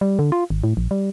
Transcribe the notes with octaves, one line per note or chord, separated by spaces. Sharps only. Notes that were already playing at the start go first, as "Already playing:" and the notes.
G3
D3
F4
G#1
A2
A#1
G3